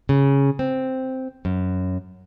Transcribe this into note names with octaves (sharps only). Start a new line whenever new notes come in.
C#3
C4
F#2